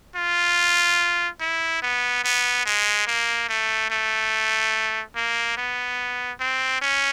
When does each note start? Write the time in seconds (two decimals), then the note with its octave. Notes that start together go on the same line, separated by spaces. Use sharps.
0.16 F4
1.40 E4
1.82 B3
2.24 B3
2.66 G#3
3.07 A#3
3.49 A3
3.90 A3
5.15 A#3
5.57 B3
6.40 C4
6.82 C#4